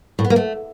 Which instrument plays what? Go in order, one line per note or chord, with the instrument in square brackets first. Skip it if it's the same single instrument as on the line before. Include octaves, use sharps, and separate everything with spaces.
[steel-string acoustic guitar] A2
B3
A#3
A3